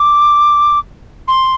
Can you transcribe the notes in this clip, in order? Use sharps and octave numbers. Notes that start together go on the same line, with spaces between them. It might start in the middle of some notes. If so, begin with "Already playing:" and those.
Already playing: D6
C6